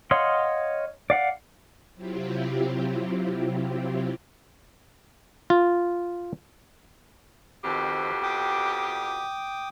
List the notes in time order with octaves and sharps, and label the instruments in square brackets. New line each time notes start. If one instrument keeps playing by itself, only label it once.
[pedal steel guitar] C#5 D#5 F5 F#5 C6
D5 F5 F#5
[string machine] C3 F#3 C4 E4 F4 G4
[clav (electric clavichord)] F4
[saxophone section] F2 B2 G4 [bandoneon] D#3 C4
[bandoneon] G5 D6 D#6